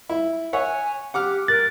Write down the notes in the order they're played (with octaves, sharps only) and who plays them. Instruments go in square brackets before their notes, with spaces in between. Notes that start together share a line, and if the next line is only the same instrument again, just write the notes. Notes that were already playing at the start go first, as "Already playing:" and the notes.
[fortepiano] E4
[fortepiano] C#5 E5 F#5 [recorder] G#5
[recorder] G4 [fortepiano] F#5 D6 F6
[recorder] A#4 [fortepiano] F#6 [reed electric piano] A6